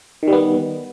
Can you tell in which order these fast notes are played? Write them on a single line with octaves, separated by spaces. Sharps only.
D#3 G3 B3